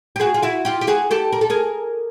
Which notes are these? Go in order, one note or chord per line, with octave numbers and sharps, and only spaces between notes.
G4
F#4 G#4
F4
E4 F#4
F4 G4
G4
F#4 G#4
G4 A4
A#4
A4
G#4 A#4